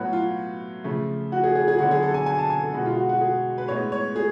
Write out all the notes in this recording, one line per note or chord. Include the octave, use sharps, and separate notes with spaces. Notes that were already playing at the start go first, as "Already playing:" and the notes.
Already playing: A2 F#3 B3 F#4
F4
C#3 F3 A3
F#4
G#4
G#4
G#4
D3 F#3 B3 F#4
G#4
A4
G#5
G#5
A5
G#5
A4
B2 G#3 B3 F#4
F4
F#4
F#4
G#4
B4
A2 G#3 B3 C#5
C#5
G#4